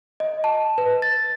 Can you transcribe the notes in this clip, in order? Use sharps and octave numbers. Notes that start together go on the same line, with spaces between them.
D#5
A5
B4
A6